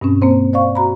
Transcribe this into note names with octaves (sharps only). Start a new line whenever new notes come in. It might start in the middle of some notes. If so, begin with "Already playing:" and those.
G2 B2 C4 C#4
A#3 C4 C5
C5 D5 F5 C#6
F#4 A#5 B5